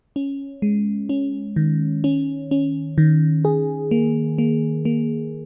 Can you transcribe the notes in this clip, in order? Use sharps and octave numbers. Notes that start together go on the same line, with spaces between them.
C#4
G#3
C#4
D#3
C#4
C#4
D#3
G#4
A#3
A#3
A#3